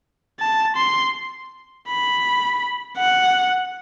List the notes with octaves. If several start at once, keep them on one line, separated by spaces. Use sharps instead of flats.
A5
C6
B5
F#5